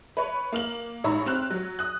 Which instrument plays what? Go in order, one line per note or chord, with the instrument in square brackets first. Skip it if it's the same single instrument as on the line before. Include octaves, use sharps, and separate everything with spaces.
[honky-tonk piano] B4 C#5 B5
A#3 F6 F#7
A1 G#2 C#5 A#5 B5 E6
C4 F6 F#6
F#3
D#6 F#6